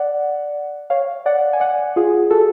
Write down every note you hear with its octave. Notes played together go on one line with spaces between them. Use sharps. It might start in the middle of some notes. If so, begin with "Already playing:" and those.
Already playing: D5 F#5
C#5 F5
D5 F#5
G#5
D5 F#5
F4 G#4
F#4 A4